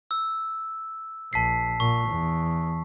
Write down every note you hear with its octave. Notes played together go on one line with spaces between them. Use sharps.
E6
A#1 A5 B6 C7
A#2 C#6
E2